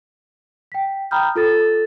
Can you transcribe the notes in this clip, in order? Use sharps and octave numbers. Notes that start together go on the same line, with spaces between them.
G5 B6
G5 A#5 B5 D#6 F6 G6
F4 A4 A6